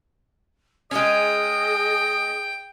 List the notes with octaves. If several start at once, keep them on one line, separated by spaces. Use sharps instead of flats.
G#3 C#4 G#4 D#5 G5